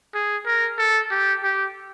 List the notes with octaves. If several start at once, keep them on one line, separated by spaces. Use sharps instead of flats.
G#4
A#4
A4
G4
G4